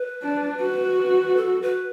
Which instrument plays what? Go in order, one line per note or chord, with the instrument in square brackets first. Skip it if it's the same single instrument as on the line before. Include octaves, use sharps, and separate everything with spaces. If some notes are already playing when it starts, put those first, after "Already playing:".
Already playing: [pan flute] B4
[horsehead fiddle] D4
F#4
[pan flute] A4
B4